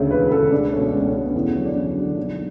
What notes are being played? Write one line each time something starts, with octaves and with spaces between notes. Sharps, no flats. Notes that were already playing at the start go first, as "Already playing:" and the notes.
Already playing: D2 C#3 C#5
E1 B4
D2 C#3 A4
C#2 D4
B2 A3 C#4
C#2 D4
C#4
B2 A3
B3
E2 C#4
B3
D3 F#3 C#4
D4
E2
D3 F#3
B1